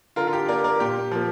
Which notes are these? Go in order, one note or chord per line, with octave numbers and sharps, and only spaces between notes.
D3 F4 A#4
F4
G4
A#3 A#4 D5
A#4 D5
A#2 G4
F3 A#3